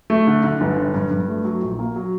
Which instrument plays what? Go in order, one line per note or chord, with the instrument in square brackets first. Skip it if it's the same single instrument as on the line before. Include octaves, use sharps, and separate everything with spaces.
[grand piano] A3
D3
D3
G1
D3
G2
G2
A3
F#3
A#1
A#3
F#3